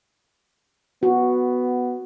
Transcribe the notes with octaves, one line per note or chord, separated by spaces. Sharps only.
B3 F#4